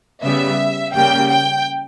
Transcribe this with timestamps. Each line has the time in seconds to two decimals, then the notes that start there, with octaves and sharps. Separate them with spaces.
0.24 C#3 G3 B3 E5
0.94 C#3 G3 A#3 G5
1.30 G5